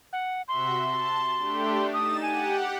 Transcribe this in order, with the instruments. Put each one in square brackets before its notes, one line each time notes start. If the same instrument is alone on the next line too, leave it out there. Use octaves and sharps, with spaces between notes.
[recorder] F#5
[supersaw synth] C3 F#4 E5 [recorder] C6
[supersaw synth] A5
A3 D4 G4
[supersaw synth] D#4 A6 E7 [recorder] D#6
[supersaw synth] G4 F#5 [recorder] G#5